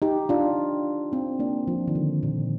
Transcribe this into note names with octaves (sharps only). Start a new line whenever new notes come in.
D#4 G4
D4 F4
C4 D#4
A#3 D4
F3
D#3
D3
A#2